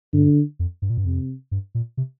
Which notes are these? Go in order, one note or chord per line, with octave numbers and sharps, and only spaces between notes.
G2 D3
F2
G2
A#2
G2
F2 C3
G2
A#2
C3